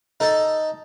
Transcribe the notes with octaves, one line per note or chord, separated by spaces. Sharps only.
D#4 A4